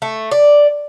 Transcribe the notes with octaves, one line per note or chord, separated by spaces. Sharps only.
A3
D5